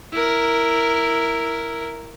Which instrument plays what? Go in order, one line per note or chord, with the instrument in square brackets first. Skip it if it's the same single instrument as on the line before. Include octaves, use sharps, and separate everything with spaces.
[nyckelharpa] E4 A#4